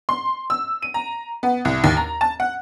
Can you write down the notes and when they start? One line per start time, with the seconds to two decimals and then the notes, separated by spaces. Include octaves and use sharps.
0.09 C6
0.50 E6
0.82 D#7
0.94 A#5
1.43 B3
1.65 C2
1.84 D#2
1.97 A#5
2.21 A5
2.40 F#5